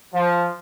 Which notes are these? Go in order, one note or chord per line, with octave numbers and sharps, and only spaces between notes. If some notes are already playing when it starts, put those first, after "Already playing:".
F3